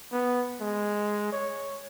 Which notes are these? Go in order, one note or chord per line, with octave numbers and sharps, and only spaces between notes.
B3
G#3
C#5